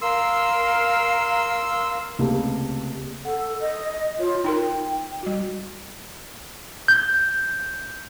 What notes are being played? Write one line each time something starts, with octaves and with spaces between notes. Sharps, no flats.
A#4 F5 C6 E6
C#2 C3 G3 A3 A#3
A4 F#5
D#5
F4 C#5
D#4 F4 A#4 G5
G3 F#4
G6